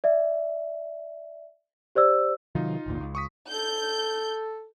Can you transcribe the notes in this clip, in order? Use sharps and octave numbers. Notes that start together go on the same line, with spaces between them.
D5 E5
G4 C5 D5 E6
C3 D#3 F#3 D#4 F4
G#1 D2 A#2
C#2
C#6 D#6 B6
A4 G6